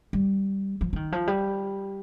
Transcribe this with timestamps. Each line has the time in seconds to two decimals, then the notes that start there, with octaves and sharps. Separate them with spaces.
0.13 G3
0.81 F3
0.93 F3
0.96 D#3
1.12 F3
1.27 G3